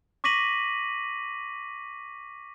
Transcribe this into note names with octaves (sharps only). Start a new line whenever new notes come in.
C#6 D6 A#6 B6 D#7 F#7